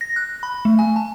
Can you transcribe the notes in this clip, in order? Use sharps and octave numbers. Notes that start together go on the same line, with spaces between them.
A#6
F#6
B5
A3
G#5
A5